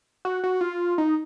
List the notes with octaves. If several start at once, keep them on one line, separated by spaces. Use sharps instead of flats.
F#4
F#4
F4
D#4